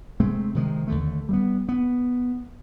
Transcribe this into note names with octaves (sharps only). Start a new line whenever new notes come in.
C3 G#3 A3 C4
C3 D#3 F3 G#3
D#2 D3 A3
G3 A3 B3
B3